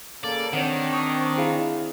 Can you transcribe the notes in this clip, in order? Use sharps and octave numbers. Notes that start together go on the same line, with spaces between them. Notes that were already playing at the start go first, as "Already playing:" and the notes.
C#3 A#3 A4 D5
D#3 C4 D4 C#5 F#5
C#6 D#6
E4 G#4 F5